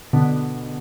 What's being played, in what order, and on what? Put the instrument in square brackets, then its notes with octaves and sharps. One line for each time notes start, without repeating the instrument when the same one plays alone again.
[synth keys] B2 D3